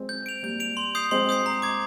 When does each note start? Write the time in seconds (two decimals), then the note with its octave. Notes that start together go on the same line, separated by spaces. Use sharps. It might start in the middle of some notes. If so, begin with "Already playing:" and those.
Already playing: G#3 C4
0.09 G6
0.26 D7 F7
0.43 G3 A#3 G6
0.60 D7 F7
0.77 C6
0.95 D#6 G6 C7
1.11 G#3 C4 C6
1.29 D#6 G6 C7
1.46 A#5
1.62 D6 G#6